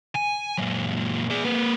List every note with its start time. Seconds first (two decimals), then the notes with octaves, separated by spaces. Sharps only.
0.15 G#5
0.58 F#2 A#2
1.30 G#4 D5
1.44 A#3 B4